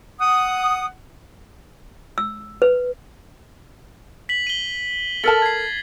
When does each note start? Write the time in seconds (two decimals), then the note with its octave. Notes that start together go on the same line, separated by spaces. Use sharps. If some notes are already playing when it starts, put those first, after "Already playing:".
0.19 F#5 D#6
2.18 E6
2.62 B4
4.29 B6 F#7
4.47 D#7 G7
5.24 A4 A#4 A5 A6 B6 F#7
5.42 G#6 C7